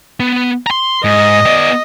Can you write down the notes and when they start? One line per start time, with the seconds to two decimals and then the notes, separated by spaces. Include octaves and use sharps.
0.20 B3
0.67 A#5 C6
1.04 G#2 D#5
1.46 B3 D5